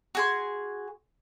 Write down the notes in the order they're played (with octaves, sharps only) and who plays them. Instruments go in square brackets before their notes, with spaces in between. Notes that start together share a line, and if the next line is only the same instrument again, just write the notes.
[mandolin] F#4 G#4 C6